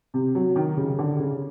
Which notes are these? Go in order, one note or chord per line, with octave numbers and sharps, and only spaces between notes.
C3
F#3
D#3
C#3
D3
C#3